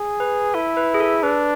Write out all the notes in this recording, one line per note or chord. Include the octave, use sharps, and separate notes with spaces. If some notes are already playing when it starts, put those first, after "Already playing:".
Already playing: G#4
B4
E4 A4
B4
G#4
A4
D4 B4